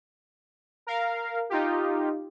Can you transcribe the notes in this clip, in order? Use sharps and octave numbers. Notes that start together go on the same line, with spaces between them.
A#4 F5
D#4 F4 G4